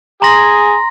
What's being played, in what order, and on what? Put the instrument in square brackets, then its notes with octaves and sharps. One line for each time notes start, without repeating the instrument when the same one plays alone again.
[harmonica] G#4 [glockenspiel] A#5 C6 A#6